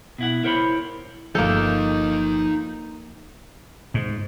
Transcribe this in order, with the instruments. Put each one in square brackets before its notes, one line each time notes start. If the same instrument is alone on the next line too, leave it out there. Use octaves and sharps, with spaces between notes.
[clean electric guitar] B2 E4 F#5
E4 A#4 C5 C#5 B5
[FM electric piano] G1 G6 [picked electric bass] F3 [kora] A#3 A4 [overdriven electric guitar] D#4 F5
[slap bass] G#2